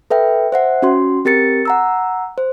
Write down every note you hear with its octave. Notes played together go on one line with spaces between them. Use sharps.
A4 B4 E5 G5
C5 E5 F#5
C#4 F#4 C6
C4 G4 A#4 A6 C#7
F#5 A#5 E6
C5